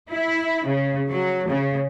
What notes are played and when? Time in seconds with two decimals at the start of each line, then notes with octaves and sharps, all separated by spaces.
0.11 E4
0.66 C#3
1.09 F#3
1.49 C#3